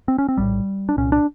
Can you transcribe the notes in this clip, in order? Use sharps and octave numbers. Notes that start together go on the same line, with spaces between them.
C4
C#4
C4
A#1 A2 G3
D4
C2 A#2 C#4
D4